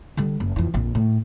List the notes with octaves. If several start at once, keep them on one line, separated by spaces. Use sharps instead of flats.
D3 G3
F#1
F2 E3
A#1 F2
A2